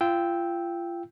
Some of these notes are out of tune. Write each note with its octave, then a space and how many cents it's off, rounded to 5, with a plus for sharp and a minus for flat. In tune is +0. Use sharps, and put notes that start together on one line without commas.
F4 -30 G5 +0 E6 -10